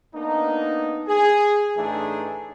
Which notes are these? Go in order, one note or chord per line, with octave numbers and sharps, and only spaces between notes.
A#3 B3 D4 D#4
G#4
A2 E3 A3 D4 D#4 G#4